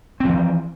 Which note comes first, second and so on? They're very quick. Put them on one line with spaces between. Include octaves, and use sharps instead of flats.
C4 F3 E3